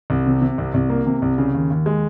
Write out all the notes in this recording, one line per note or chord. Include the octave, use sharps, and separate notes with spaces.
C2
C3
C3
C2
C2
A#3
C3
C2
C#3
D#2
D#2
G#3